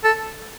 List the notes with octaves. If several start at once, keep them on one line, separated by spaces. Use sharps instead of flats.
A4